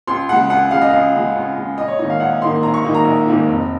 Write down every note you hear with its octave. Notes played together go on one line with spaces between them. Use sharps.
C#2 C6
C#3 G#3 F#5
C#2 F#5
C#3 G#3 F5
D#5
C#2 F5
C#3 G#3
C#2
C#3 G#3
A#1 D#5
C#5
G#2 D#3 A#3 D#4 D#5
F5
A#1 F#5
G#2 D#3 A#3 D#4 C6
A#1 A#5
C#6
G#2 D#3 A#3 D#4
A#5
A#1
G#2 D#3 A#3 D#4
F1